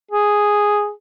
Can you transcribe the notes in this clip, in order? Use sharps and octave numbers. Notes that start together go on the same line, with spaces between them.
G#4